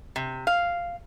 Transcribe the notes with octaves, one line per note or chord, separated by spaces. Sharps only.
C3
F5